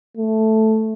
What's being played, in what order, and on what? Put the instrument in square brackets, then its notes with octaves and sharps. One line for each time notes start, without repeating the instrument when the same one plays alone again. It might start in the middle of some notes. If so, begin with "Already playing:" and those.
[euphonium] A3